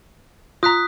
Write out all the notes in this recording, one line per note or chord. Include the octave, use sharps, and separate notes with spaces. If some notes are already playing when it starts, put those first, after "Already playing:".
F4 A#5 D#6 F#6 B6